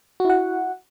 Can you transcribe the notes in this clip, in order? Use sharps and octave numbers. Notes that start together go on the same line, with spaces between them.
E4 F#4 F#5